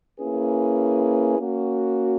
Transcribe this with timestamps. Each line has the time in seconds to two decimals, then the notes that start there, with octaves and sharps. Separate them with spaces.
0.18 A#3 C#4 E4 G#4 B4
1.38 A#3 C#4 F#4